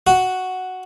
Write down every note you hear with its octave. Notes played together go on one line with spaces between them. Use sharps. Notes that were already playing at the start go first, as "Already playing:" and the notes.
F#4